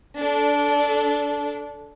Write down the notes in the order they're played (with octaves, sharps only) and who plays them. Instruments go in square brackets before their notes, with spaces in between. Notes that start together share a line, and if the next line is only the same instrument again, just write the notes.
[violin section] D4 A4